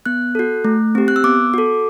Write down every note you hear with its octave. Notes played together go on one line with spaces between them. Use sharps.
B3 F#6
F#4 A4
A3
C4 G4
F#6
E6
B3 D6
F#4 A4